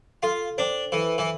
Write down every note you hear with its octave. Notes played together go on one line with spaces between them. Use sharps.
F4 A4
D4 C5 G5
E3 A4
E3